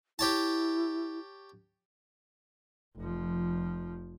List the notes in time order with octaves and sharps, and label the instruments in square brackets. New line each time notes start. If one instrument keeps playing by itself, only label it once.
[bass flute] E4 [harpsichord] G4 C#5 A5
[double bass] F1 F3